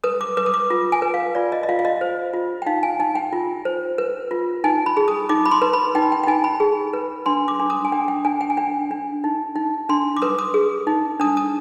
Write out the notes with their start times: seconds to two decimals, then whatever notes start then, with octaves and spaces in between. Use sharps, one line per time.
0.04 B4 D#6
0.21 D6
0.37 B4 D6
0.46 D#6
0.54 D6
0.70 F4
0.92 G#5
1.02 B4
1.14 F5
1.35 F4 D5
1.52 D#5
1.63 D#5
1.69 F4 F5
1.79 F5
1.85 D#5
2.01 C5
2.33 F4
2.62 G5
2.66 D#4 F5
2.83 G#5
3.00 D#4 G#5
3.15 G5
3.33 F4
3.65 C5
3.98 B4
4.31 F4
4.64 D#4 G#5
4.86 B5
4.97 G#4
5.08 D#6
5.29 D#4 D6
5.45 B5
5.51 C6
5.62 B4
5.73 B5
5.95 D#4 G5
6.12 G5
6.23 G5
6.27 D#4 G#5
6.44 B5
6.60 G#4
6.94 B4
7.26 D4 C6
7.48 D6
7.60 D4
7.70 D#6
7.85 G#5
7.92 D4 G5
8.08 G5
8.25 D4 G#5
8.41 G5
8.50 G#5
8.57 D4 G5
8.91 D4
9.24 D#4
9.56 D#4
9.89 D4 C6
10.17 D6
10.22 B4 D#6
10.39 D#6
10.54 G#4
10.87 D#4
11.20 D4 D#6
11.37 D#6